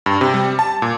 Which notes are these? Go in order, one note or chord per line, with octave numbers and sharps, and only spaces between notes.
G2
C3
G3
A5
A#2